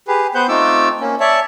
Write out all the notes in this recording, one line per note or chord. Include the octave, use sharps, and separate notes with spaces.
G4 G#4 B4
B3 B4 C5 F#5 G6
A3 C4 D#4 F4 D6 E6
A#3 C#4
C#5 D5 E5 A5